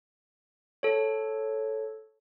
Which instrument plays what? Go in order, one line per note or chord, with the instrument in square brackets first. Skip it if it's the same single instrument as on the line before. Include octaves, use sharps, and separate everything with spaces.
[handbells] A4 C#5